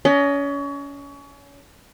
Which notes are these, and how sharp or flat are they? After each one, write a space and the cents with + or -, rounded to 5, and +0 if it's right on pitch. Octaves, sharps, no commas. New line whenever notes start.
C#4 +30 D#5 +0